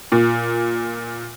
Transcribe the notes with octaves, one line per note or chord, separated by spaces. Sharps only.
A#2